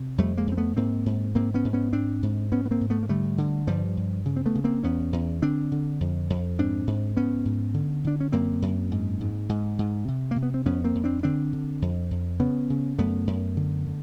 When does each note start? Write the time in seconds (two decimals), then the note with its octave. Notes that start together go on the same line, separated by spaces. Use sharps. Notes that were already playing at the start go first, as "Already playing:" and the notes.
Already playing: C3
0.18 F2 G3 A3
0.37 G#3 A#3
0.47 F2 C4
0.57 A3 B3
0.77 G#2 A#3 C4
1.06 G#2
1.35 G#2 A#3 C4
1.54 B3 C#4
1.64 G#2
1.73 B3 C#4
1.93 G#2 C4 D4
2.23 G#2
2.52 G#2 B3 C#4
2.66 B3
2.71 A#3 C4
2.81 G#2
2.90 A3 B3
3.03 A#3
3.09 D3 G3 A3
3.38 D3
3.67 G2 F3 G3
3.97 G2
4.25 C#3
4.37 C4
4.46 A3 B3
4.55 C#3
4.64 A#3 C4
4.83 E2 B3 C#4
5.13 E2
5.42 D3 C4 D4
5.72 D3
6.01 F2
6.30 F2
6.59 G#2 C4 D4
6.87 G#2
7.17 G#2 B3 C#4
7.45 G#2
7.74 D3
8.04 D3 D4
8.20 C#4
8.32 F#2 A#3 C4
8.62 F#2
8.91 G#2
9.21 G#2
9.49 G#2
9.79 G#2
10.08 C3
10.31 C3 A#3
10.43 B3
10.54 C4
10.66 F2 B3 C#4
10.84 A#3 C4
10.95 F2
11.04 C4 D4
11.23 D3 C4 D4
11.53 D3
11.82 F2
12.11 F2
12.40 C#3 B3 C#4
12.70 C#3
12.98 F#2 A3 B3
13.27 F#2
13.57 D3
13.86 D3